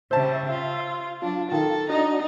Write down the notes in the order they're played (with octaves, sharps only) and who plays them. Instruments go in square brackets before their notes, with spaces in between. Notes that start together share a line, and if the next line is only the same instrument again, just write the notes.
[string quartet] C#3 G3 [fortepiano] C5 A5 [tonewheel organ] E5
[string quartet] F4
[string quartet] F#3 D4 [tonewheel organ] F4
[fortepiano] D#3 [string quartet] A4
[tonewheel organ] D4 F#4 D#5 [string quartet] D#4